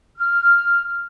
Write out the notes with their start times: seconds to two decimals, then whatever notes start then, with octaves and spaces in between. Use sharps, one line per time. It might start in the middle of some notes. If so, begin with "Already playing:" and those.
0.17 F6